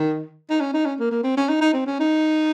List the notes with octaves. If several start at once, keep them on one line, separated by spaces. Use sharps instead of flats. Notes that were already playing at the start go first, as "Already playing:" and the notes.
Already playing: D#3
D#4
C#4
D#4
C#4
A#3
A#3
C4
C#4
D#4
D#4
C4
C#4
D#4